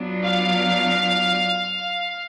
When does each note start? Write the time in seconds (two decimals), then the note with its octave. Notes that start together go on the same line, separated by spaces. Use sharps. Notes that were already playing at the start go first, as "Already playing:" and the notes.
Already playing: F#3 B3 D4 F4
0.24 F5